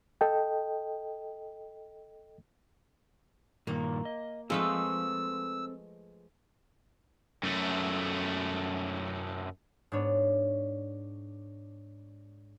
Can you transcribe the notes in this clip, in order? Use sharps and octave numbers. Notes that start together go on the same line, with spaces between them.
A4 D#5 G5
G2 A#2 D#3 A#3
D#5
F3 G#3 A3 C4 A4 B4 C5 E6
F#2 A3
G#2 B3 D4 C#5